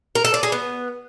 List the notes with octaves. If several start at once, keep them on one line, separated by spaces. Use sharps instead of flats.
A#4
A4
D5
G#4
B3